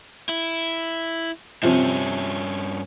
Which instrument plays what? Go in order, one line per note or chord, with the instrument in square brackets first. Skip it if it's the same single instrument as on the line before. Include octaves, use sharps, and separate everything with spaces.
[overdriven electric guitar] E4
[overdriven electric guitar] G2 C#4 [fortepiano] C3 F3 C4